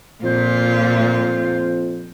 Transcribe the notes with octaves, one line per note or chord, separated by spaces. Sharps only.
F2 A#2 F4 C5